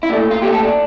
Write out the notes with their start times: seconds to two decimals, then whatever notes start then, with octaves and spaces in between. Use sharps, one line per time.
0.03 E4
0.09 A#2 D4
0.13 A3
0.31 F4
0.42 A#2 G4
0.45 A3
0.52 A4
0.63 D4